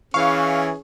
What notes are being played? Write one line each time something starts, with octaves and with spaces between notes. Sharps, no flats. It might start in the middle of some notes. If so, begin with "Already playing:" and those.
E3 C#4 G#4 F5 C#6